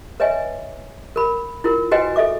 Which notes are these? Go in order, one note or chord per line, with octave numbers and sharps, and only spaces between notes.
B4 C#5 D#5 E5 G#5
A#4 B5
E4 F4 A#4
F#4 B4 C5 D#5 G5 G#5
A4 D#5 E5 D6